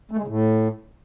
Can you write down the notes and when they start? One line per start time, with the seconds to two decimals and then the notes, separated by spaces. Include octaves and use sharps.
0.11 A3
0.17 G#3
0.22 C#3
0.28 A2